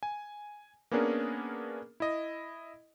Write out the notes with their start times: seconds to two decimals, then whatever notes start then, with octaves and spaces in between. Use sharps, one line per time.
0.03 G#5
0.91 A#3 B3 C#4 D4 G#4 A#4
2.00 E4 D#5